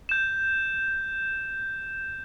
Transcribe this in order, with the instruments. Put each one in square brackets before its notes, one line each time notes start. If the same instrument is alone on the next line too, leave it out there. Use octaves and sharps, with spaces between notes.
[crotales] G6 E7